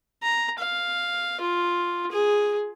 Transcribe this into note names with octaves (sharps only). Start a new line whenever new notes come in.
A#5
F5
F4
G#4